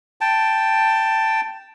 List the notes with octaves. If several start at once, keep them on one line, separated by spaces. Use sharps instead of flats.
G5 A5